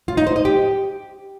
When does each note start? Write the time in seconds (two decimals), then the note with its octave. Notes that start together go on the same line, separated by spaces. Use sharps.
0.08 F4
0.17 D#4
0.27 C5
0.36 D#5
0.45 G4